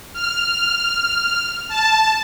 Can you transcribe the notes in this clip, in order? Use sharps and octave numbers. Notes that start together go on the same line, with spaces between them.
F6
A5